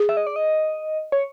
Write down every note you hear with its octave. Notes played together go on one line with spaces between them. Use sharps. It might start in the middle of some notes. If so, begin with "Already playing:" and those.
Already playing: G#4
E5
D#5
D5
D#5
C#5